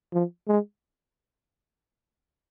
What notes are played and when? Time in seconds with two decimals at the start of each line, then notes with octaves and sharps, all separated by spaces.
0.13 F3
0.48 G#3